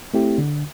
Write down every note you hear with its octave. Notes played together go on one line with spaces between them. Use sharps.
A3 C4 E4 G4
D3